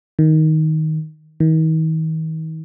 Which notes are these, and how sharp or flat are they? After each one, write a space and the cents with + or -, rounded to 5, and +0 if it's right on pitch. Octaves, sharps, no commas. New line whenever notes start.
D#3 +10
D#3 +40